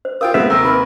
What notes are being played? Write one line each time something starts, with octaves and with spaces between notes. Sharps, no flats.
C5
F4 A#4 F5 G5 D#6
G#3 B3 C4 E5
D#2 C3 A#4 E6
D#4 B4 A#5 B5